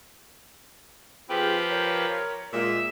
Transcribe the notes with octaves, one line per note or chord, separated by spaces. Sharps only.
F3 C4 F4 G4 G#4 B4
A#4 C#5
A#2 G#3 E5